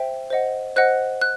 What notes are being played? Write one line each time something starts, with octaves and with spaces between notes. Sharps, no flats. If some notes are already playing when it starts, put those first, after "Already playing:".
Already playing: C5 E5 G5
C5 D#5 F#5
C5 D#5 F#5 F#6
F#6